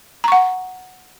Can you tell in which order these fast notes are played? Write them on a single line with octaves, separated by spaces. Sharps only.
A#5 C#6 F#5